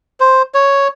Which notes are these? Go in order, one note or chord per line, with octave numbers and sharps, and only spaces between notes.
C5
C#5